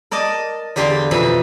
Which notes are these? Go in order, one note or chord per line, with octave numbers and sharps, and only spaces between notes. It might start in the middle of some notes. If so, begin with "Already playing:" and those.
A#4 D5 D#5 A5
E2 D3 G4 D5 F5 C6
F2 B2 E3 F3 B5